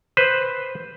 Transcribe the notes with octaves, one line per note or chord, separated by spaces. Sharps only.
B4 C5